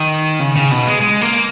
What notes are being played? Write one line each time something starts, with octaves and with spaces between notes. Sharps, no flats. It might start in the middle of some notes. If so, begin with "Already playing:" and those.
Already playing: D#3
C#3
C#3
B2
G#3
G#3
A#3